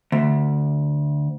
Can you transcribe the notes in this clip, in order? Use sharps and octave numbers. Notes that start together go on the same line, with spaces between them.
D2